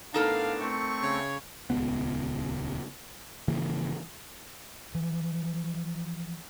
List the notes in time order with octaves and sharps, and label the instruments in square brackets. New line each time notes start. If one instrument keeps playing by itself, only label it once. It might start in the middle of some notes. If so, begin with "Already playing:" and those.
[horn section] A2 B3 D4 [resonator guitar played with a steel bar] D#4 A4 A#4 [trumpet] F5
[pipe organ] A3 C4 [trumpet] C#6
[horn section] C#3 C#5
[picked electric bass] D#1 C#2 C#3 B3
G#1 C#3 E3 A#3
[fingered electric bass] E3 F3